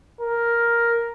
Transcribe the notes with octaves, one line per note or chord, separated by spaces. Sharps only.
A#4